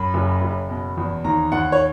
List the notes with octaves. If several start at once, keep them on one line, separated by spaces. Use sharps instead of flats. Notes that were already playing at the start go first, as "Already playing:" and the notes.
Already playing: F#2 B5
F#1
F#1
B2
E2
D#2 A#5
D#2 F#5
C#5